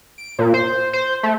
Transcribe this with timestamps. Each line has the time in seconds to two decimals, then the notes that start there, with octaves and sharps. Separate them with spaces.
0.18 D7
0.39 A#2
0.54 C5
0.93 C5
1.23 A3